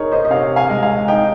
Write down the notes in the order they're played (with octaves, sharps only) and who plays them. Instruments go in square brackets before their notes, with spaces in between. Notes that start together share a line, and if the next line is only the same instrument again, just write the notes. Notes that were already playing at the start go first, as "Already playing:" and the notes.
Already playing: [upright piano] D#4 G#4 A#4 C#5
C5 D#5
D#5
C3 C#5 F5
F5 G#5
G#3
F5 G#5
D#4 D#5 G5